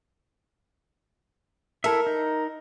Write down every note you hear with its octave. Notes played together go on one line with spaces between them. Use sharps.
E4 A4 A#4 E5
D#4